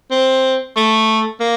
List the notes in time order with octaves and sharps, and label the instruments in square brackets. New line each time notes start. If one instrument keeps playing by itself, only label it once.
[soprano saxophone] C4
A3
A#3